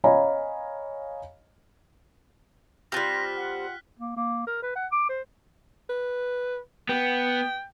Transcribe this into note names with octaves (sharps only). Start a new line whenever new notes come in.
C#5 D#5 F5 G#5 A#5 B5
G3 C4 F4 G4 F6 F#6 A#6 B6
F#5
A#3
A#3
A#4
B4
F#5
D6
C5
B4
B3 G5